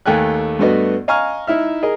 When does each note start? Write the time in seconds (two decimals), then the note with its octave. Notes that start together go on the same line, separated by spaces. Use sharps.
0.06 D#2 A3 G5 G#5 F#6
0.59 G2 A3 B3 F#4 D#5
1.08 D#5 F5 G#5 A#5 C#6 F6
1.47 D#4 E4 E5 F6
1.83 G#4 A#4 D#5